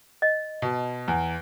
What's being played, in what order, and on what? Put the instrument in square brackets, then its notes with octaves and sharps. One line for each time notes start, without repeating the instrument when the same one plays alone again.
[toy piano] D#5
[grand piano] B2
E2